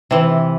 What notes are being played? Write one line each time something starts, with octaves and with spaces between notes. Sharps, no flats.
C3 E3